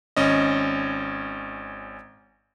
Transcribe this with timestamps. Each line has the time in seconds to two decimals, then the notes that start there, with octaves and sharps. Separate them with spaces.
0.16 G#1 C#4 D#5